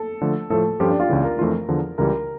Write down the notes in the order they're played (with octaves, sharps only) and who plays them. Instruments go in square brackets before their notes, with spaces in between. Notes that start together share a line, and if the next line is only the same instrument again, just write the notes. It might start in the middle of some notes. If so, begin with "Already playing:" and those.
Already playing: [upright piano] A4
[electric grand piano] D3 F3 A3
[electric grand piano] A2 F3 A3 [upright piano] A4
[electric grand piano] G2 F3 C#4 F4 A4 [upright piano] G4
[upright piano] D4
F4
[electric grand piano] C#2 C#3 E3
[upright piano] A#4
[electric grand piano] F2 E3 A3 D4 F4
E2 D3 F3
[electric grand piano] C#2 C#3 E3 G3 [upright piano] A#4